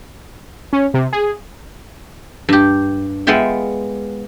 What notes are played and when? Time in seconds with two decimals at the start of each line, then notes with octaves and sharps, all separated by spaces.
0.73 C#4
0.94 C3
1.13 G#4
2.49 G2 G4
3.27 G#3 B3 F4 E5 G5